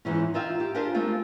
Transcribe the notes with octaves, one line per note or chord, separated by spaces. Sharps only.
E2 G#2 E3 C#4
D#4 F4 E5 F5 G5
G4
D4 F4 G4 G#4 A#4 C5
G#3 A3 C4 F4